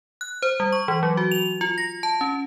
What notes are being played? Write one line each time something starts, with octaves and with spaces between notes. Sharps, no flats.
F#6
C5
G3
C#6
E3
F#3
F#4
F7
F4
A#6
A5
C#4